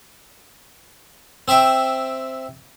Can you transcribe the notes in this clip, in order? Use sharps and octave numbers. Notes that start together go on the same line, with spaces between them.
C4 C5 E5 G5